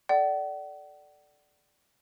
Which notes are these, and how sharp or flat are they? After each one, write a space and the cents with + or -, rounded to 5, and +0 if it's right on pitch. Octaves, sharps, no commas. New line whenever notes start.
A4 -10 D5 +0 F#5 +40